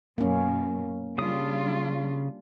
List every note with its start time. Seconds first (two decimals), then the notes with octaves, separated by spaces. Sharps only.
0.18 F#2 B2 A#3 C#4
1.18 C#3 G3 D4 F4 D#6